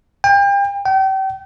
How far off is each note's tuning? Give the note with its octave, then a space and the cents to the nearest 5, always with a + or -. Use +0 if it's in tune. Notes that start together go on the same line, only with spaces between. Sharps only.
G5 +35
G5 -35